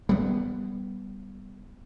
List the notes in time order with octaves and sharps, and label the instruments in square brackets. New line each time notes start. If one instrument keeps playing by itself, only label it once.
[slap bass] G3 B3